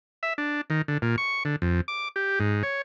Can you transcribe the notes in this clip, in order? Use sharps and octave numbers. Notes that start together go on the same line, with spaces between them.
E5
D4
D#3
D3
A#2
C#6
D3
F2
D6
G4
G#2
C#5